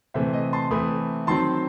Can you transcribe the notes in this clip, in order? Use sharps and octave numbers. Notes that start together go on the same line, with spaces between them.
C3 E3 A3 C5 E5
D#5
A5 C6
E3 A3 C4 B5 D#6
D#3 F#3 C4 A5 C6